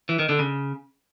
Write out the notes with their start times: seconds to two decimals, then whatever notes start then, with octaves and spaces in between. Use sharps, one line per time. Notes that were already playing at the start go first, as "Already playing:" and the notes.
0.09 E3
0.19 D#3
0.29 D3
0.39 C#3